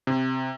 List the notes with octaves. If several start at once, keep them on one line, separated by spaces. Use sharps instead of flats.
C3